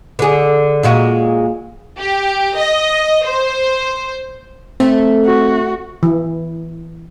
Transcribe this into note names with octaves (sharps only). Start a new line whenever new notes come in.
D3 G#4
A#2 G#3 F#4
G4
D#5
C5
A3 C4
F#4
E3